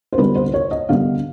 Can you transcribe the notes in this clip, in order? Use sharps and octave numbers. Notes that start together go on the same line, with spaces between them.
C5
D3 G3 B3 B4
C5
C#5
D#5
D3 G3 B3 F5